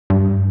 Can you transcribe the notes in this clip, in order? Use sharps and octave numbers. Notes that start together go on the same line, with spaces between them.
G2